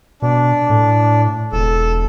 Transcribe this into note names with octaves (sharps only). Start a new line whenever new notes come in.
B2 D4
A2
E1 A4